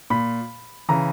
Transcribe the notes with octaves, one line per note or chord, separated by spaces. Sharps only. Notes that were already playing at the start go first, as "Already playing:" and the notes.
A#2 B5
C#3 E3 A#5